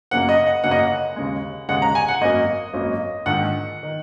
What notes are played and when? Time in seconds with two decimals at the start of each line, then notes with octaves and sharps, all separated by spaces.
0.11 F#1 F#2 C#3 A#3 F#5
0.29 D#5
0.47 F#5
0.64 F#1 F#2 C#3 A#3 F#5
0.71 D#5
0.79 F#5
1.16 D#2 C#3 G#3
1.69 D#2 C#3 G#3 F#5
1.82 A#5
1.95 G#5
2.08 F#5
2.21 G#1 F#2 F#3 A#3 D#5
2.73 G#1 F#2 F#3 A#3
3.26 A#1 G#2 D#3 F#5
3.83 D#3